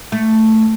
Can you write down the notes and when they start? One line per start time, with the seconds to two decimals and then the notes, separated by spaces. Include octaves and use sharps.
0.12 A3